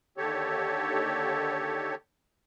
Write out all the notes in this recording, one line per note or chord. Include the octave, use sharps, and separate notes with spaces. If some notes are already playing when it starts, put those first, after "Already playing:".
D#2 D3 G4 A4 C#5